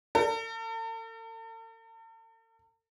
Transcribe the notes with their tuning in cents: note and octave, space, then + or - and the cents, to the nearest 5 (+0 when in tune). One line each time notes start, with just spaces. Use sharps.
A4 +45